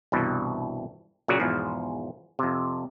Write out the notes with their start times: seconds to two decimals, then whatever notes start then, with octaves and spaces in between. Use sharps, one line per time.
0.12 C2 G2 B2 E3
1.28 A#2 C#3 F#3 F#4 D5
1.40 E2 G#2 B2 F3
2.39 F2 C3